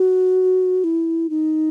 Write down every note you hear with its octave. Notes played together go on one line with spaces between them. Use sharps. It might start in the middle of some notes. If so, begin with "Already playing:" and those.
Already playing: F#4
E4
D#4